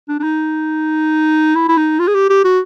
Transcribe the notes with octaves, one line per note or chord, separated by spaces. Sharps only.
D4
D4
D#4
E4
E4
D#4
F4
G#4
G4
G4
F#4